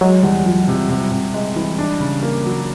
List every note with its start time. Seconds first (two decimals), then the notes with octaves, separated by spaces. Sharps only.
0.01 F#3 G#3
0.23 E2 G3
0.45 F3 F#3
0.68 C3 G3
0.90 C3
1.11 C3
1.34 G#3
1.56 E3
1.79 D4
2.00 C#3
2.23 A#3
2.46 F#3